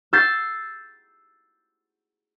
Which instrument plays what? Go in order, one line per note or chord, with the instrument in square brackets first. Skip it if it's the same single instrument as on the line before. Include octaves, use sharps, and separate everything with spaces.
[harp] E6 G6 A6 C7